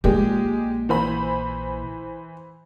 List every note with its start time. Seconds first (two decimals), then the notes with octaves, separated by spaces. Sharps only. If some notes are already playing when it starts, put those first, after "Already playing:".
0.04 A#1 A#2 G#3 G4
0.89 E3 C5 B5